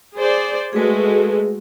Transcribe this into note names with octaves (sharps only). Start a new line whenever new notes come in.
G#4 C5 D5
G#3 A3 F#4 G#4 B4